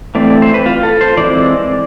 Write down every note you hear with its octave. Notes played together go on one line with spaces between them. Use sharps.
E3 A3 C4 D5
C5
B4
F4
A4
C5
E3 G#3 C4 D5